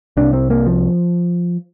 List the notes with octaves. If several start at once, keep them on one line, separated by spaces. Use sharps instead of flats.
C2 C3 D4
C4
A#3
F3